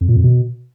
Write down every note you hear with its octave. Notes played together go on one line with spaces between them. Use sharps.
F2
A#2
F2
B2